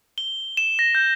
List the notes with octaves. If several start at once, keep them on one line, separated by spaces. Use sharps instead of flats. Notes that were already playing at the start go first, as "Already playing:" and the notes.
G7
E7
A#6
G6